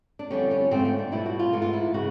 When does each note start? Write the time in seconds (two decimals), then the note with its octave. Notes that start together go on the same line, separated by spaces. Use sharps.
0.19 D4
0.30 F2 D3 G3 C#4
0.51 C#4
0.71 G#2 F3 A3 C4
0.85 C#4
0.99 D4
1.12 B2 G3 E4
1.26 F#4
1.39 F4
1.53 G#2 E3 A3
1.62 F4
1.73 E4
1.94 C#3 E3 G#3 F#4